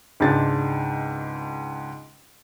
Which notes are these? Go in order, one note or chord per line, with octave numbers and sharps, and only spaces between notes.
C#2 G#2 D4 G#4 A6